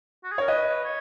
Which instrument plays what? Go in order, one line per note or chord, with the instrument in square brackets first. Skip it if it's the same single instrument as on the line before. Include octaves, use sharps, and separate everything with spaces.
[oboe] F#4
G#4
[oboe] A#4 [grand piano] C#5
[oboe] B4 [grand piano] D#5
[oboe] B4
C#5